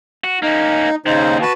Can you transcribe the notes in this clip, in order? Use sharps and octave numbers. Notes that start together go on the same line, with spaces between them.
F#4
A#3 C#4 D#4
D#2 C#3 D#4 C5
F#4 B4 A5